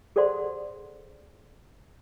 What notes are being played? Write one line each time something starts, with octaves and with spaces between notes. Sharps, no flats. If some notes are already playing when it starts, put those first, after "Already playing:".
G#4 A4 C5 D5 F#5 C6